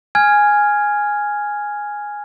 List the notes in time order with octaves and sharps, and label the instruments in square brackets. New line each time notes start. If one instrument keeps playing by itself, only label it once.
[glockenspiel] G#5 F6 G#6